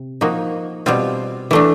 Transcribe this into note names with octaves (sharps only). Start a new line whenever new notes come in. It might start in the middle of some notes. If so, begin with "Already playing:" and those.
Already playing: C3
F3 A#3 D#4 F#4
B2 G3 C4 F4
E3 A3 D4